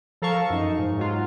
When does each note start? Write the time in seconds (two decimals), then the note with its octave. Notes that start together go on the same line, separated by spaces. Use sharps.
0.22 F3 A4 A#4 F5 A5 C#6
0.50 F#2 D#4
0.79 G#2
0.97 G#2 F#3 F4